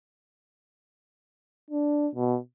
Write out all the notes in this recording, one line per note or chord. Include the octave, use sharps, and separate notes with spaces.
D4
B2